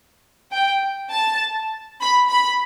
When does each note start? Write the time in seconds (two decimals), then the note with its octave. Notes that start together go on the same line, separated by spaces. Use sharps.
0.52 G5
1.12 A5
2.01 B5
2.29 B5